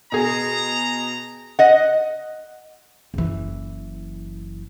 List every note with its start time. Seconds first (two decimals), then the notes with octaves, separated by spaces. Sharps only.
0.12 B2 G#4 A#5
1.59 D#5 F#5
3.14 F#1 E3